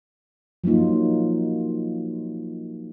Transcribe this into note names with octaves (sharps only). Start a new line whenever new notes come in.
F3 F#3 A#3 D#4 F4